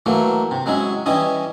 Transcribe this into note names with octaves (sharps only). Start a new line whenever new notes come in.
E3 F#3 A3 A#3
C3
F#3 G#3 C#4 E4
E3 G3 C#4 E4 D#5